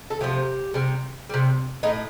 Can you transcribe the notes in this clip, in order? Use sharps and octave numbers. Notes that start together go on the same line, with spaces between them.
A4
C3 F3 A3 G4
C3 G3
C3 G3
A2 A3 D#4